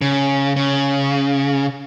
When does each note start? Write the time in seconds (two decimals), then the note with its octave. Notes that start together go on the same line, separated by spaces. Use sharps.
0.01 C#3
0.56 C#3